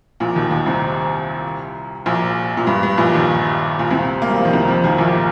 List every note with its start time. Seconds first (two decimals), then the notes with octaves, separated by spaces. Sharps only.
0.20 A#1 A#2
0.36 D#2 D#3
0.51 D#2 D#3
0.66 C2 C3
2.06 A#1 A#2
2.57 A#2
2.67 G2
2.83 G2
2.98 A#1 A#2
3.13 D#2 D#3
3.79 A#2
3.91 C2 C3
4.22 A#3
4.30 G3
4.38 F3
4.45 D#3
4.53 C2 C3
4.68 F2 F3
4.84 D#2 D#3
4.98 A#1 A#2